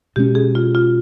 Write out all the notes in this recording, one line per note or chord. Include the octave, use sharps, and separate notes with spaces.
B2 G#3 C#4 G4
G#4
F4
F4